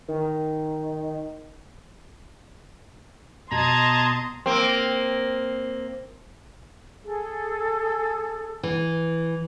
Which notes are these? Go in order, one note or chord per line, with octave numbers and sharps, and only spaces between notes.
D#3
B2 D#5 A5 A#5 C6 G#6
A#3 C4
G#4 A4
E3